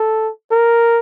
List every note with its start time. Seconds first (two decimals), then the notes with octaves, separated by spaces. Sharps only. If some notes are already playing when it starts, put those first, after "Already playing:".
Already playing: A4
0.51 A#4